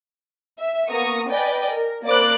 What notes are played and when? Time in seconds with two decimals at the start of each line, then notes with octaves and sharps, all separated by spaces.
0.58 E5
0.88 A#3 B3 A#5 C#6 D#6
1.28 B4 D5 D#5 G5 G#5
1.71 A#4
2.05 A#3 C5 D5 B5 D6 F#6